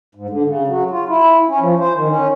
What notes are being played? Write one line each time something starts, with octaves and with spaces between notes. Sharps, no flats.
G#2
D3
C#3
F#3
F4
E4
C#4
F3
C5
D#3
C#4